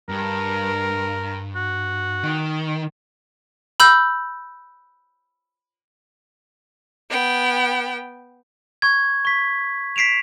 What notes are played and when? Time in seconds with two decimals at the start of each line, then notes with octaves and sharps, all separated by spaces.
0.09 G2 A#4
1.56 F#4
2.23 D#3
3.80 B5 E6 G6
7.10 B3 G5
8.82 C#6 G#6
9.25 C#6 B6
9.96 B6 C7 D7 E7 F7